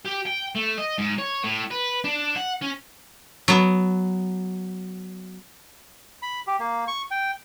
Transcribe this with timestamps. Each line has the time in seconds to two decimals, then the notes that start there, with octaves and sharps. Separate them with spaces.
0.05 G4
0.26 G5
0.55 A3
0.78 D#5
0.98 G#2
1.18 C#5
1.44 A2
1.70 B4
2.04 D4
2.36 F#5
2.62 C#4
3.48 F#3 B3
6.22 B5
6.47 G4
6.59 A#3
6.88 C#6
7.11 G5